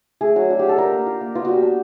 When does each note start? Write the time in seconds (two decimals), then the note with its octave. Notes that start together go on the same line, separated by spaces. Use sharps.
0.21 A3 G#4
0.36 F#3 F#4
0.50 D4 F#4
0.59 F4 G4
0.69 A4
0.77 D4 A#4
0.92 A#3
1.06 F4
1.21 A#3
1.35 B3 F4
1.45 G3 F#4
1.53 G4
1.62 D4